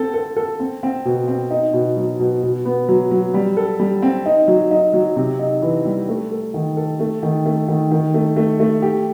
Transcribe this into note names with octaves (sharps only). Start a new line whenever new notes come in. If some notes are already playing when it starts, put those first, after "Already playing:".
Already playing: C4 A4
A4
A4
C4
C4
B2
C4
D#4
B2
F#3
B2
B2
B3
F#3
F#3
G3
A4
G3
C4
D#4
F#3
D#4
F#3
C3
D#4
E3
G3
A3
A4
D#3
A4
A3
D#3
A3
D#3
D#3
A3
A3
A3
G4